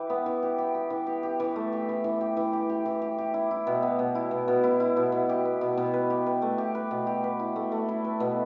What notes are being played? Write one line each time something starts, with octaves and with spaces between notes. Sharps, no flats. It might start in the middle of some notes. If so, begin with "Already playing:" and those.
Already playing: E3 G4 B4
B3
E3
G4
G4
G4
E3
G4
G4
E3
A3
G4
E3
E3
G4
E3
G4
G4
E3
G4
G4
E4
E4
B2
B3
B2
E4
B2
B2
E4
E4
B2
B2
G4
B4
B2
B2
B4
G4
B4
A3
G4
B4
B2
G4
B4
E4
A3
A3
E4
B4
B2